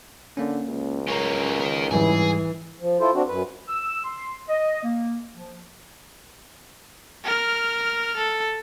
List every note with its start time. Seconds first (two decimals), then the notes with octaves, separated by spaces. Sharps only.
0.37 D3 A#3 C#4
0.68 C#2
1.08 A#3 C#4 A#5 C#6
1.60 D#4 A#4
1.91 G#2 E3 G3 G#4
2.80 F3
3.00 E4 F4 A4 C5
3.14 C4 D4 F#4
3.28 F#2 B4
3.69 E6
4.05 C6
4.48 D#5
4.83 A#3
5.35 F3
7.24 A#4 F6
8.17 A4